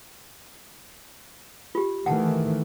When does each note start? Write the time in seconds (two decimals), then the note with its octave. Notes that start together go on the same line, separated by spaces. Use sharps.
1.75 F4 G4
2.06 D#3 E3 A3 F#5 A5